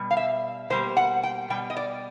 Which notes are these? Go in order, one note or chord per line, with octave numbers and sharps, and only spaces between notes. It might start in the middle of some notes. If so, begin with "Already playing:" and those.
Already playing: B2 G3
F5
E5
B2 G3 A#3 C5
F#5
G5
B2 G3 G5
D#5
D5